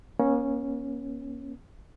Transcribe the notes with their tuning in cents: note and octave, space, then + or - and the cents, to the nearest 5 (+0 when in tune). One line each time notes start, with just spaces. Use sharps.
A#3 +40 C#4 -5